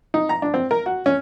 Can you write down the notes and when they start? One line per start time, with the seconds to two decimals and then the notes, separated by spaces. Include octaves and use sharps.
0.14 D#4
0.29 A#5
0.42 D4
0.54 C4
0.71 A#4
0.86 F#4
1.06 C#4